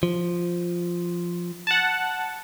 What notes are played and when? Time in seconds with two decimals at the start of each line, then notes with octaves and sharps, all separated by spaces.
0.03 F3
1.67 F#5 A5